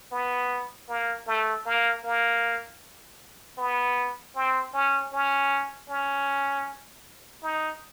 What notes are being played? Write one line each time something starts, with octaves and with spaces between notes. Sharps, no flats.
B3
A#3
A3
A#3
A#3
B3
C4
C#4
C#4
C#4
D#4